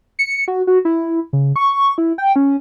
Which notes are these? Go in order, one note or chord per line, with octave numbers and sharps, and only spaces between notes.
C#7
F#4
F#4
E4
C#3
C#6
E4
G5
C#4